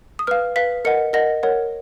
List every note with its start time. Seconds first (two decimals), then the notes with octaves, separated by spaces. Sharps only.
0.19 D#6
0.27 B4 F5 F6
0.56 B4 F5 B6
0.85 A#4 D#5 F#5 C#7
1.13 A#4 D#5 F#5 A#6
1.43 A#4 C#5 F#5